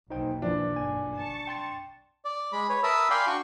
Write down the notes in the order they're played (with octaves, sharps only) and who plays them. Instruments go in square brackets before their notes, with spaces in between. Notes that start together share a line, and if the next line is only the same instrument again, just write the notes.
[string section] B1 E2 A#2 [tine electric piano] D#4 C5 G5
[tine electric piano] E3 F3 [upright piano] D4
[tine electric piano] G1 G#5
[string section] A5 C#6
[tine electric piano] G5 C6 A6
[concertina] D5
G#3 B5
B4 C#5
A#4 E5 A5 B5 D#6 E6
D5 F5 G5 G#5 B5 C6
D4 F#4 G5 C#6